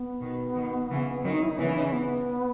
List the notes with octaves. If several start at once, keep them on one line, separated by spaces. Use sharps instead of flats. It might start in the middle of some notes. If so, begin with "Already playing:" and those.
Already playing: B3
B2 D#3
B2 D#3
C#3 E3
D#3 F#3 C#4
D#4
E4
D#4
C#3 E3 B3
C#4
D#4
C#4
B3